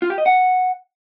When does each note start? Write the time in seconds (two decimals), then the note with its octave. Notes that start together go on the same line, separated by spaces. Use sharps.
0.02 F4
0.10 G4
0.18 D#5
0.26 F#5